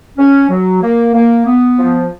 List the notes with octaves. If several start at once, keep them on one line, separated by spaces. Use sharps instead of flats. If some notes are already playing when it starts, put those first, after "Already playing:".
C#4
F#3
A#3
A#3
B3
F3